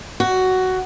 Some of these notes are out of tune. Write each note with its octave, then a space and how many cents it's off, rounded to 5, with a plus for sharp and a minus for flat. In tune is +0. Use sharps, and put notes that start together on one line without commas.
F#4 +10